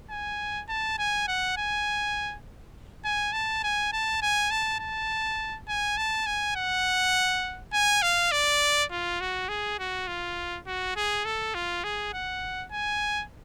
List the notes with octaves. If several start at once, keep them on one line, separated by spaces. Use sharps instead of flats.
G#5
A5
G#5
F#5
G#5
G#5
A5
G#5
A5
G#5
A5
A5
G#5
A5
G#5
F#5
G#5
F5
D5
F4
F#4
G#4
F#4
F4
F#4
G#4
A4
F4
G#4
F#5
G#5